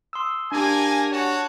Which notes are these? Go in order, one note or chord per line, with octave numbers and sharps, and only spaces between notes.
C6 D#6 E6
A#3 D4 G4 G#5
F#4 C#5 A5